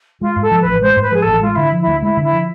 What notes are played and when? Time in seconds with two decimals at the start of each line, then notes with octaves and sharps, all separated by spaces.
0.21 G#3 F4
0.36 G#2
0.41 A4
0.51 F3
0.61 B4
0.66 A1
0.82 G#3 C5
0.97 G#2
1.02 B4
1.11 F3 G#4
1.22 A4
1.27 A1
1.41 G#3 F4
1.55 D3 E4
1.72 F3
1.80 E4
1.87 D2
2.02 G#3 E4
2.17 D3
2.23 E4
2.33 F3